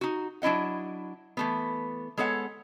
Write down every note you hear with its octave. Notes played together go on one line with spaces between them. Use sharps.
D#4 F#4
F#3 D4 E4 D#5 F#5
E3 A3 B3
G#3 B3 A4 C#5 F5 F#5